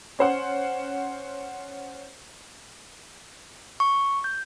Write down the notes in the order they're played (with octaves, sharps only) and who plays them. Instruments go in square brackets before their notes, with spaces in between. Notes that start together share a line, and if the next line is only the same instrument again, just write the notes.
[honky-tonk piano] C#4 C5 F#5
[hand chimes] C#6
G6